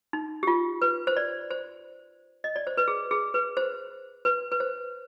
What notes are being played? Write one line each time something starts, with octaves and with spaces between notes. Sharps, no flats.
D#4
G4
F4
B4
C5
D5
C5
D#5
D5
C5
B4
G#4
G#4
B4
C5
B4
B4
C5